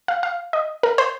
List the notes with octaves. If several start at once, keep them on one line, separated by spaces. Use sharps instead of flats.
F5
F5
D#5
A#4
C5